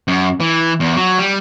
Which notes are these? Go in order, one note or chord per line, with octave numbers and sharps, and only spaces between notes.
F#2
E3
E2
F#3
G3